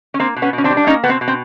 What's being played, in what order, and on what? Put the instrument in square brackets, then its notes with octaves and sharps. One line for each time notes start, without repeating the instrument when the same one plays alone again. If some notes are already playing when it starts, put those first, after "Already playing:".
[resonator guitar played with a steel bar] C#4
A#3 C4
B2
B3 C#4
B2
C#4
C4 D4
G3
D4
A#3 C#4 D#4
B2 B3
C4
B2
C4